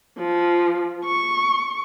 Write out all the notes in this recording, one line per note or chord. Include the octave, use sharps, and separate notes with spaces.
F3
C#6